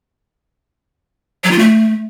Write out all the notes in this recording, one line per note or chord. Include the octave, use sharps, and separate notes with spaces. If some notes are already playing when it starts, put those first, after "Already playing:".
F#3
F4
A3